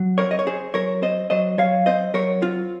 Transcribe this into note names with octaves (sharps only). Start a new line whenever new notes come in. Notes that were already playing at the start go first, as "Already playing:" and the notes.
Already playing: F#3
C4 A#4 C#5
D#5
C#5
C4 G#4 C5
F#3 A#4 C#5
C4 C5 D#5
F#3 C5 D#5
F#3 C#5 F5
C4 C5 D#5
F#3 A#4 C#5
C4 F4